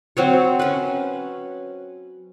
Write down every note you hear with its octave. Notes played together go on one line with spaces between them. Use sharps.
F#3 C4 C#5
C#4 B4